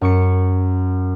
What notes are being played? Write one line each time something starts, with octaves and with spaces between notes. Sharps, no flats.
F#2 C#6 C#7